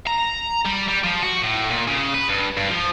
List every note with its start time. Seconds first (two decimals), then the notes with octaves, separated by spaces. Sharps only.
0.07 A#5
0.66 G3
0.88 G3
1.04 F3
1.23 F#4
1.42 A2
1.70 A#2
1.88 C#3
2.14 B4
2.28 G2
2.57 G2
2.70 F3